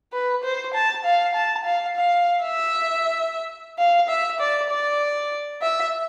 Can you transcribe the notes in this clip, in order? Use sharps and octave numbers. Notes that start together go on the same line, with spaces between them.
B4
C5
A5
F5
A5
F5
F5
E5
F5
E5
D5
D5
E5